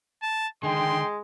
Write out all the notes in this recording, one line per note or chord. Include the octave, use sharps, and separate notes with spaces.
A5
D3 D#3 G#3 G5 C6